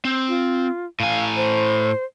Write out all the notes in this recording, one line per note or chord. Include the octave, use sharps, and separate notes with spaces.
C4
F4
A2 F5 G#5
C5